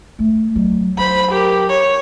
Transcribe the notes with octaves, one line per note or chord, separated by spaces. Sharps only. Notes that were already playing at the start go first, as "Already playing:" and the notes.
A3
F#3
F#3 C5 B5
G4 A#4
C#5